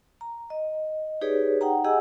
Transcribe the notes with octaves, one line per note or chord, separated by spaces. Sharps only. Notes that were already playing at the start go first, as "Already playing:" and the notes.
A#5
D#5
D#4 G4 G#4 B4 C#5 D5
D#4 F#5 G5 A#5
G4 G#4 D#5 F#5 G#5 E6